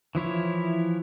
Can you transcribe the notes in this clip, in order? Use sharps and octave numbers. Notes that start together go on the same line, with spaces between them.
E3 F3 E4 C#5